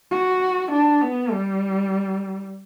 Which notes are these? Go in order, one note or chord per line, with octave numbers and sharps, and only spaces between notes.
F#4
D4
B3
G3